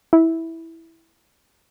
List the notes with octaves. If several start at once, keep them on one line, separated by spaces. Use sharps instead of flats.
E4